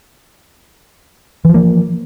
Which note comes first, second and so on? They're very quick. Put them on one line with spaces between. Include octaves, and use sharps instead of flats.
E3 F3 A#3